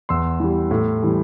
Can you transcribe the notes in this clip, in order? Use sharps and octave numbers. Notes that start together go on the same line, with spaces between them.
E2 C6 E6
E3 G3
A2
E3 G3